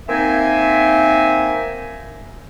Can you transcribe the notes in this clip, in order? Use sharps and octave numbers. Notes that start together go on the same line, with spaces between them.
A#3 C4 D#4 E5 G#5